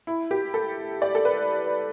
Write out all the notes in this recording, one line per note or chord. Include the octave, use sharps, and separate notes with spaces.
E4
G4
A4
D5
A4
B4